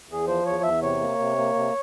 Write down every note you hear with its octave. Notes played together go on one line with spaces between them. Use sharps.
E2 G#4
F3 C5
E2 C#5
E2 E5
C3 C#5
A#3
C3
A#3
C3